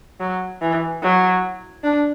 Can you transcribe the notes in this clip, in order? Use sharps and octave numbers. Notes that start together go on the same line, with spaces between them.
F#3
E3
F#3
D4